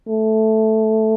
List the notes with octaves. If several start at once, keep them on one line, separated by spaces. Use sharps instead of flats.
A3